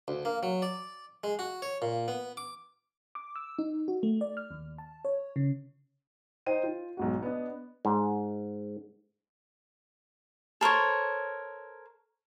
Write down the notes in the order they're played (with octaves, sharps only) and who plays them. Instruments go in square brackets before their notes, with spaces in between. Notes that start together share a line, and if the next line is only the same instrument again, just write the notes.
[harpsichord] D2
A#3
F#3
D5
G#3
F#4
C#5
A#2
B3
D6
[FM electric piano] D6
E6
D#4
F#4
A3
D5
F6
D#2
A5
C#5
C#3
[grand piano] D#4 C5 D#5 G5 D#7
F4
B1 G#2 F#4
B3 D4 D#5
[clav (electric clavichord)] G#2
[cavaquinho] A4 A#4 C5 C#5